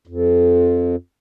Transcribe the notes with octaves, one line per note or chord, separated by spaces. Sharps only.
F2